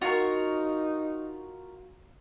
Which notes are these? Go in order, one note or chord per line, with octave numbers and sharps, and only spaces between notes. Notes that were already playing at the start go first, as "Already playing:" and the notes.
D#4 F4 F#4 A#4 C#5